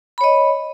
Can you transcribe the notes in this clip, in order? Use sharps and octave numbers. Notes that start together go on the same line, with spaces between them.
C#5 D#5 B5